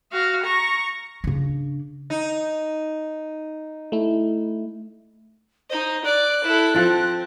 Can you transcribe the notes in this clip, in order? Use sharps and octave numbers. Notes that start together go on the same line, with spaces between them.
F#4 F5
A#5 C#6
C#3 D4
D#4
A3 E4
D#4 C5 D#5
D5 D6 F#6
E4 A4
F3 C4 A4